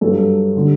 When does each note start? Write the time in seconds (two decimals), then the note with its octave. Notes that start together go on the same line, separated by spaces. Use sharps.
0.01 G2 F#3 A4
0.56 D3 G3